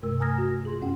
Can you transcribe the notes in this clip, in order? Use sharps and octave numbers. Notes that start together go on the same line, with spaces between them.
G2 C3 A3 A#4 E6
G#5 A#5 D#6 F6 G#6 A#6
F#4
F4 G#4 C6
F#2 B3 C#4 F#5 G5